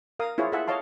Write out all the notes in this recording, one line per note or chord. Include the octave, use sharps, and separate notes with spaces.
A#4 F5 D#6
E4 F4 G#4 C5 C#5
E4 F4 G#4 A4 E5 F#5
C#5 D#5 F5 A5 C6